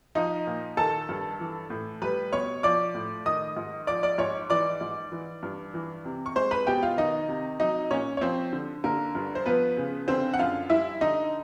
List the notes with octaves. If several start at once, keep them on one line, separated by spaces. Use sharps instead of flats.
F3 D#4 D#5
A#2
D#3 A4 A5
G2
E3
A2
G3 B4 B5
B2 C#5 C#6
F3 D5 D6
A2
D#3 D#5 D#6
G#2
F3 D5 D6
D5 D6
G#2 C#5 C#6
E3 D5 D6
G#2
E3
G2
E3
C3
C#6
G#3 C5 C6
B4 B5
B2 G4 G5
F4 F5
D#3 D#4 D#5
C3
F#3 D#4 D#5
A#2 C#4 C#5
C#5
F3 C4 C5
D3
D3 A#3 A#4
G2
C5
F3 B3 B4
C#3
D3 C4 C5
F#5
F#2 F4 F5
G3 E4 E5
D3 D#4 D#5